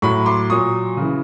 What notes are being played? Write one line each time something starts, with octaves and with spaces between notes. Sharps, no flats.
A2 F#3 B5 C#6
C6 D6
A#2 F#3 C#6 D#6
C#3 E3